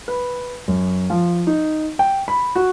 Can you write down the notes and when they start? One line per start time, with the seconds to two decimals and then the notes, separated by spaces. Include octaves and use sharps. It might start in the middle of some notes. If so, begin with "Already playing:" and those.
0.08 B4
0.68 F#2
1.10 F3
1.47 D#4
1.99 G5
2.28 B5
2.56 F#4